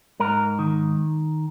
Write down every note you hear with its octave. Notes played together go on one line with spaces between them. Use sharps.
G#2 A#4
D#3